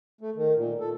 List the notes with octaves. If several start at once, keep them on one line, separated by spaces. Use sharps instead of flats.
A3
D#3
A#2
A4